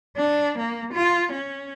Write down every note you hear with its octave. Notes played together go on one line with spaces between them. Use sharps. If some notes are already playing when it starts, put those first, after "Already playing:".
D4
A#3
F4
C#4